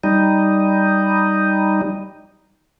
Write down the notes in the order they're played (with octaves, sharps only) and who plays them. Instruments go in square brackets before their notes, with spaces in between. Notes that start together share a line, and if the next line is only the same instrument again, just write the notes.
[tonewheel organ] G3 D#4